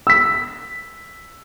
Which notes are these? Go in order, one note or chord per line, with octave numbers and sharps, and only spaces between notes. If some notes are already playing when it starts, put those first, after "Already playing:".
E6 B6